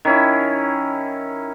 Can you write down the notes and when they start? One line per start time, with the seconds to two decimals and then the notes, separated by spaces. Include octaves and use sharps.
0.05 D#3 C#4 E4